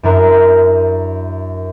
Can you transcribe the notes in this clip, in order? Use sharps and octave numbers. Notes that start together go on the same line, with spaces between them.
F#2 D4 E4 A#4